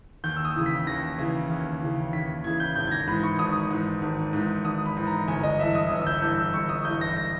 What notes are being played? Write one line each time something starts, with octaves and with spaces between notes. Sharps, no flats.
D#2 G6
E6
D#6
C#3 E3
B6
D#2 A#6
C#3 E3
D#2
C#3 E3
D#2 B6
C#3 E3 G#6
G6
G#1 G6
G#6
A#6
G#2 E3 B5
C#6
G#1 D#6
G#2 E3
G#1
G#2 E3
G#1 D#6
B5
G#2 E3
A#5
G1 G#5
D#5
G2 E3 E5
D#6
G1 E6
E6
G6
G2 E3 G6
E6
G1 C#6
D#6
G2 E3 G6
A#6
A#6